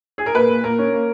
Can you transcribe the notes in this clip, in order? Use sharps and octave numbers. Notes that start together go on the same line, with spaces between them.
G#4
A#4
A#2 B4
A#2
A#2 A#4
C#4
A#3